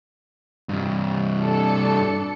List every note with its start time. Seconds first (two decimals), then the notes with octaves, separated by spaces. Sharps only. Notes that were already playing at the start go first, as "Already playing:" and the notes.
0.69 G2 C3
1.43 D4 A4 C#7